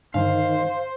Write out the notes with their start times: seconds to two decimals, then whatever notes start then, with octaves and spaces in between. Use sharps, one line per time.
0.14 G2 D3 D#3 C5 F5